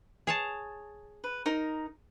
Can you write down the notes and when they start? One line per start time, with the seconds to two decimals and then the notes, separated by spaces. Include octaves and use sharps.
0.27 G#4 C#5 A5
1.24 B4
1.46 D#4 A#4